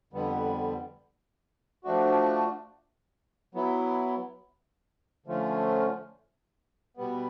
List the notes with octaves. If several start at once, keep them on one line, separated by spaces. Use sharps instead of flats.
F2 D3 G3 B3
F3 A3 D4 F#4
F#3 B3 E4
D3 F3 A3 C#4 F4
B2 G3 B3